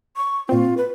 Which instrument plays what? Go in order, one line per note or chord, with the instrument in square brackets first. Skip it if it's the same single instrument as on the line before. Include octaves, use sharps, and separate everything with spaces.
[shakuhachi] C#6
[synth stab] A#2 C4 [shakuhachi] F4
[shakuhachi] B4